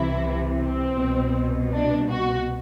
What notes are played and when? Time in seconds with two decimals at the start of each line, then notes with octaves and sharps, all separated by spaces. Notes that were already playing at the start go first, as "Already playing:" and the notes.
Already playing: C2 C3 E3 E4
0.58 C4
0.97 C2 B2
1.73 D4
2.11 F#4